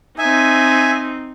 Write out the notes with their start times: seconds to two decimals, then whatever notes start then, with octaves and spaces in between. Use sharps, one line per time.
0.18 C4 D#4 E5 G#5